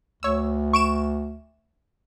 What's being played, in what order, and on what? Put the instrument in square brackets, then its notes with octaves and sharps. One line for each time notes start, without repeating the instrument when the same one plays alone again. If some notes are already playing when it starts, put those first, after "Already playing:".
[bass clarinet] D2 [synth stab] C#5 E6
[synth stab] C#6 D7 E7